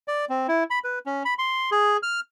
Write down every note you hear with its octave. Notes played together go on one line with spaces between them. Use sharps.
D5
C4
E4
B5
B4
C#4
B5
C6
G#4
F6